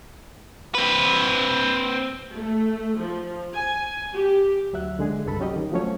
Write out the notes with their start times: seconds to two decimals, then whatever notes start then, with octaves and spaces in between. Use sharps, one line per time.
0.75 C4 B4
2.36 A3
2.98 F3
3.54 G#5
4.15 G4
4.73 D2 F#3 E5 F#6
4.99 D3 G#3 G#4
5.26 C2 G2 A4 B5
5.40 F#3 C#4 G4 D#5
5.56 D#3
5.72 F3 F#3 A3 C#4 C#5